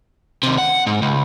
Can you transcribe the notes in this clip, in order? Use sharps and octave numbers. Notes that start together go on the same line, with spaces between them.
D#2 C3
F#5
G#2
C#2